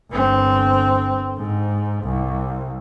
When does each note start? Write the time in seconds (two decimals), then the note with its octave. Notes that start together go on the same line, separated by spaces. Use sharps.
0.11 G1 C4
1.38 G#2
2.04 C2